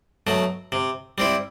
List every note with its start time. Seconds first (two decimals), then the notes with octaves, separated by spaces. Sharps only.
0.27 B2 F#3 A3
0.72 C3
1.18 G3 C4 E4